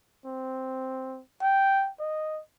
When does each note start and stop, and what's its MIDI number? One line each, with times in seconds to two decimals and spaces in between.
0.25 1.21 60
1.41 1.90 79
1.99 2.41 75